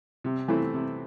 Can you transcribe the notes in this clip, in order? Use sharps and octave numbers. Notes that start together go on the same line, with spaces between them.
C3
E3 A3 C4 E4
C3